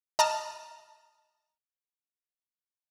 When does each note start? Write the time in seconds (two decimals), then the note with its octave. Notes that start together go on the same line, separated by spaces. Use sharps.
0.19 D#5 A5 A#5 F6